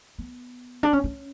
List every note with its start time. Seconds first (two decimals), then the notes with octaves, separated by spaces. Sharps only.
0.19 B3
0.83 D4
0.93 C#4
1.04 C#4